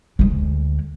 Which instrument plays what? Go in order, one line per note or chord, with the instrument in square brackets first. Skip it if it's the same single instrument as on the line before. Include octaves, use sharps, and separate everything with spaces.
[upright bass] D2 G#3